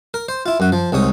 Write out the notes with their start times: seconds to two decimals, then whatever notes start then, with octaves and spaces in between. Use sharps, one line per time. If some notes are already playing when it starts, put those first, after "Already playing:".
0.14 A#4
0.28 C5
0.46 E4 F4
0.60 F#2 F#4
0.72 F3
0.92 C2 G#2 C#5 D#6